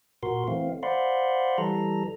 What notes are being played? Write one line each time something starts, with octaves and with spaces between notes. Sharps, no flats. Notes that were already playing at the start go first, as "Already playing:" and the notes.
A#2 F#4 A#4 C6
E3 A3 C4 F5
C5 D5 F5 F#5 B5 C6
E3 G3 A4 A#5